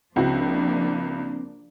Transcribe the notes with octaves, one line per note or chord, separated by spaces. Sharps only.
C#2 F3 A#3 C4 D4 E4 F#4